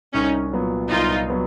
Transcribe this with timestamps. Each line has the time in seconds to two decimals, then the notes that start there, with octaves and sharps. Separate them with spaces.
0.14 C2 C#4 D#4
0.52 A#2 F#3 B3
0.91 C2 D#4 F4
1.30 F#3 B3